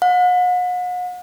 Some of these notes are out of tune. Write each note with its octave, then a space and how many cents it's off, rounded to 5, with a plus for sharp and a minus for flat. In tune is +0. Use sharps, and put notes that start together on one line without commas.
F#5 -40